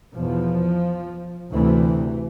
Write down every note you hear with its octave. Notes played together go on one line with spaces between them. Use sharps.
E2 B2 F3
D2 C3 E3